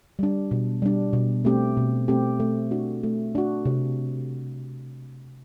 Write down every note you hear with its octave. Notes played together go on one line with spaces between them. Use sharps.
G3 D4
B2
G3 D4
B2
A3 C4 G4
B2
A3 C4 G4
A3
D4 F#4
A3
D4 F#4
C3